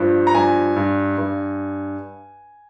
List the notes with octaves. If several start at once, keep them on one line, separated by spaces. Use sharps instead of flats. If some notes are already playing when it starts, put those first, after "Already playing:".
Already playing: G2 F3
A#5
G2 G#5
G2
G2